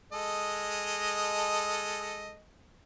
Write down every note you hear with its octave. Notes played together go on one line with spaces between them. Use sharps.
G#3 A4 D#5